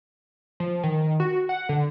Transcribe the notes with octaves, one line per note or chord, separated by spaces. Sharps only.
F3
D#3
F#4
F#5
D3